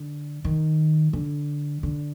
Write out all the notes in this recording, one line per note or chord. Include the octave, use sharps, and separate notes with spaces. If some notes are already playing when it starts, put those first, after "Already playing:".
Already playing: D3
D#3
D3
D3